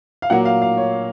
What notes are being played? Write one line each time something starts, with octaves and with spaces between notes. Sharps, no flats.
F5
A#2 F#3 A#3 F#5
F5
F5
C#5